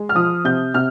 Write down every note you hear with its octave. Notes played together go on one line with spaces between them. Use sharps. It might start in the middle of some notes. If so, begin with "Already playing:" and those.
Already playing: G#3
F6
F3 D#6
C3 G6
C3 F6